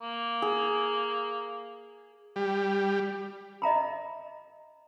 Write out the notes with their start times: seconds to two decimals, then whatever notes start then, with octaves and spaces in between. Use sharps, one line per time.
0.02 A#3
0.42 G#4
2.36 G3
3.62 D#5 E5 A#5 B5